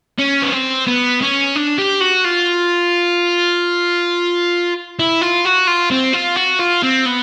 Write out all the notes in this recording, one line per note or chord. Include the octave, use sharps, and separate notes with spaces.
C#4
B3
C4
B3
C#4
D4
G4
F#4
F4
E4
F4
F#4
F4
C4
F4
F#4
F4
C4
B3